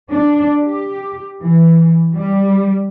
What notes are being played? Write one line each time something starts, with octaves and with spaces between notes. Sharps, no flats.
D4
G4
E3
G3